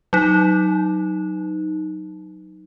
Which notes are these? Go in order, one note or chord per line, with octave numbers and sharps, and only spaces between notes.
F#3 D#4